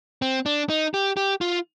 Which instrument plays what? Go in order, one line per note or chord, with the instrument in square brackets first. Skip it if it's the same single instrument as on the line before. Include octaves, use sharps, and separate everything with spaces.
[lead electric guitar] C4
D4
D#4
G4
G4
F4